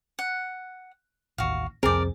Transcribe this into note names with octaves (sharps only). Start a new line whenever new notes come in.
F#5
A1 D#2 F#4 F5
C2 F2 C4 G#4 A#4 D5